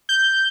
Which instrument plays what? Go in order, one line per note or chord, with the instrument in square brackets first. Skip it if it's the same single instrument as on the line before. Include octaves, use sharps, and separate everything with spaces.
[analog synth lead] G6